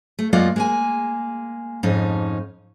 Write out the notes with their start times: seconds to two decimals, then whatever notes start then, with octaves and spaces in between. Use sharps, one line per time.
0.19 A3
0.33 F#2 G#3 A#3 F4 D5 F#5
0.56 G#3 A#3 G#5
1.83 F2 G#2 C#4 D#4